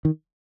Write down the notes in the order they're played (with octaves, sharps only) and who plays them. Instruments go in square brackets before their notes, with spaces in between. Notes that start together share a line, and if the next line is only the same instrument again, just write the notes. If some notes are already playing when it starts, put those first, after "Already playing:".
[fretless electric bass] D#3